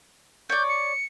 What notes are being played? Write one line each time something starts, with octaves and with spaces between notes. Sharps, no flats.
C#5 D5 G6
C#7